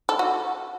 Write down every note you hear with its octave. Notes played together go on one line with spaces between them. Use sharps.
A4
F#4